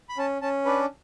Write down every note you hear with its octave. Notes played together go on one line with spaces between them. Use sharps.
B5
C#4 A5
C#4 A5
D4 B4